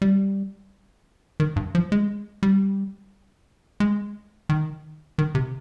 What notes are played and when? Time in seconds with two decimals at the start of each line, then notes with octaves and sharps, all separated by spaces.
0.02 G3
1.40 D#3
1.56 G2
1.75 F3
1.92 G#3
2.43 G3
3.80 G#3
4.49 D#3
5.18 D#3
5.35 C3